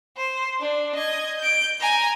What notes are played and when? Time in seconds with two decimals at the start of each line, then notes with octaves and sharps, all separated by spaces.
0.16 C5
0.60 D4
0.95 D#5 G#6
1.39 G6 D7
1.80 G#5 A#5